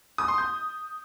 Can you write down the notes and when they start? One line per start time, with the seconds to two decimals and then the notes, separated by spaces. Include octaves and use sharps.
0.18 D#6
0.28 C6
0.38 G6